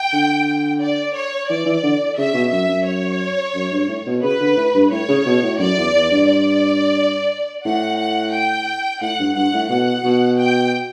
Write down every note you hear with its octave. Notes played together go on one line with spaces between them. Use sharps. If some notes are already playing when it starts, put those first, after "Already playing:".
Already playing: G5
D3
D5
C#5
E3 D5
E3
D3
C#3 E5
B2
F#2 E5
F#2
C#5
F#2
G2
A2
B2
C#3 B4
D3
A2
G2
A2 C#5
C#3
B2
A2
F#2 D5
E2
E2
G2
D5
A2 F#5
F#5
G5
A2 F#5
G2
G2 F#5
A2
B2 F#5
B2
G5